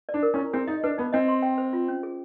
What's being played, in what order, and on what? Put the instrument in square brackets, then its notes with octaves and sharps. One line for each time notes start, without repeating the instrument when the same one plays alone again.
[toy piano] D5
[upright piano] D4
[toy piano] A#4
[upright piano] C#4
[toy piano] E4
[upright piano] C4 [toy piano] G#4
[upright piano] D#4 [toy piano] D#5
[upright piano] D4 [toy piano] B4
[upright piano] B3 [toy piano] D#4
[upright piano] C4 [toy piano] D#5
[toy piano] C6
G5
C5
F4
C#4
G#4